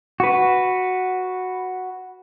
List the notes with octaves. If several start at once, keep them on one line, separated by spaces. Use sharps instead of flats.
F#4 B4